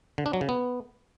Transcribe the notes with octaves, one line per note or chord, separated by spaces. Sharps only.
D3
D4
F#3
C#3
B3